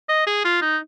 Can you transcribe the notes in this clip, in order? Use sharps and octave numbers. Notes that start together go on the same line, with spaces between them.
D#5
G#4
F4
D#4